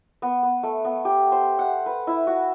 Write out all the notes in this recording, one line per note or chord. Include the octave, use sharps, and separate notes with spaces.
B3
B3
A3
B3
G4
C5
F#5
B4
E4
F#4